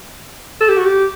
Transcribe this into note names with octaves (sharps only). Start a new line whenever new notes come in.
A4
G4
F#4
G4